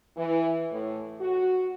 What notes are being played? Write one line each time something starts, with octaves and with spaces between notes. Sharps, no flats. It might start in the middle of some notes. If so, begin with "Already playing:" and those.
E3
A2
F#4